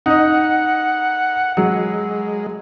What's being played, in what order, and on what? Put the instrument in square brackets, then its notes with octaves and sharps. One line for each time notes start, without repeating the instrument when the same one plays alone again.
[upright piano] D#4 D#5 [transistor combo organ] F#5
[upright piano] F#3 [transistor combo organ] G#3